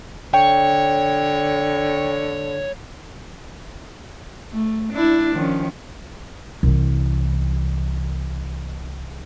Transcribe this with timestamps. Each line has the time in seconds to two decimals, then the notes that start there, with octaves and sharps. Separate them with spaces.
0.34 D3 C#5 G5
4.52 A3
4.93 D4 E4
5.35 D#3 F3 C#4
6.63 C2 E3